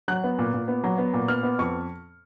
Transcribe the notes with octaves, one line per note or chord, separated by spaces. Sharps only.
F#3 F#6
B3
A#2
A#2
B3
F#3
B3
A#2
B3 F6
B3
F2 C#6